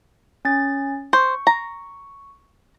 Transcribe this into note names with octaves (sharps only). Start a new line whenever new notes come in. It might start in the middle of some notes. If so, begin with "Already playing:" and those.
C#4 A6
C5 C#6
A#5